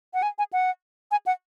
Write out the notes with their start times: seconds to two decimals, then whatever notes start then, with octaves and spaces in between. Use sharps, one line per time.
0.14 F#5
0.23 G#5
0.38 G#5
0.53 F#5
1.11 G#5
1.26 F#5